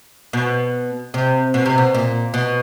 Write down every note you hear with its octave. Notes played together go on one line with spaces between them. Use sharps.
B2
C3
B2
C3
B2
A#2
B2